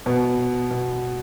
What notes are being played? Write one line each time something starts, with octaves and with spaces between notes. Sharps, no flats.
B2 B3
B2